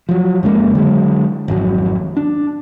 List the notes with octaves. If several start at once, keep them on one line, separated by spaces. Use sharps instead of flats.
F3 F#3
F2 C#3 G#3 A#3
D3 F#3 G#3
G#1 F2 F#3
D4